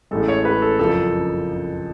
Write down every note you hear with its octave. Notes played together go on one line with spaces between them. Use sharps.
A1 A2 G#3 A4
C#5
B4
A4
F#1 F2 F3 A4